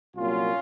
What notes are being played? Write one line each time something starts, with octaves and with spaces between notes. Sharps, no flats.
C2 A#2 F#3 A#3 C#4 F4